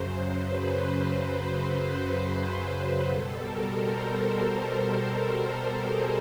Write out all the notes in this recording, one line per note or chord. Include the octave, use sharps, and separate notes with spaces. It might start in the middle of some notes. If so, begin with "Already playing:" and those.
Already playing: F#2 C#3 F#3 C5
B4
C5
C5
C5
C5
C5
B2 G3 A4
A#4
C5
C5
G#4